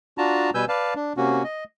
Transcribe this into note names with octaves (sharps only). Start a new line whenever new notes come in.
D4 F4 F#4 A5 A#5
B2 G3 B4 G#5 E6 G6
B4 D5 F5 A5
D4
C3 A#3 C#4 F#4
D#5